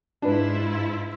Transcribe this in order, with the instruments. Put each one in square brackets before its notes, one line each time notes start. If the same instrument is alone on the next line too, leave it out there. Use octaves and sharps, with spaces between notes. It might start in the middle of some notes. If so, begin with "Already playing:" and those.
[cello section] G#2 E4 F4 [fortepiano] D4 B4